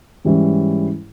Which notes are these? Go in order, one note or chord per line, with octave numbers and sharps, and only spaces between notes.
G#2 E3 G3 C#4 E4